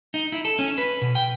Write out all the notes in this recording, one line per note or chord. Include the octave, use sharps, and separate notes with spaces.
D#4
E4
A4
C#4
B4
B2
G5